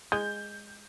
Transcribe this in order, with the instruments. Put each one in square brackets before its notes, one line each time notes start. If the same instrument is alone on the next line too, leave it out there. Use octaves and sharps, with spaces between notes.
[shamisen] G#3 [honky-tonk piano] G6